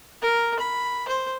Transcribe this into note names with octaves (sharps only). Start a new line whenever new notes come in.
A#4
B5
C5